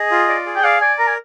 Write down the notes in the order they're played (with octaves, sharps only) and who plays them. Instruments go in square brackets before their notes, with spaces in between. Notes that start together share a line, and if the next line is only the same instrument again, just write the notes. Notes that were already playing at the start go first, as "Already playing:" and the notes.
Already playing: [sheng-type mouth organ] G#4 [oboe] D#5
[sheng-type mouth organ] F4
D5
G#4
[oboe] G5
[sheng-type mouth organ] D5 [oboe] F5
[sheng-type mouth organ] D5 [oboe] G#5
[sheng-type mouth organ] A#4 [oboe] A#5
[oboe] G#5